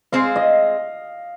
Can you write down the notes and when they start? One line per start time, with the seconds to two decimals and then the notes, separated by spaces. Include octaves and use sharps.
0.12 G#3 C4 G#4 C5 F5
0.36 D#5